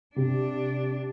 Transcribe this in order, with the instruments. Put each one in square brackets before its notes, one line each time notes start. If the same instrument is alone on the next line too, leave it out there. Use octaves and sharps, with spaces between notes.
[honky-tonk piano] C3 [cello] D4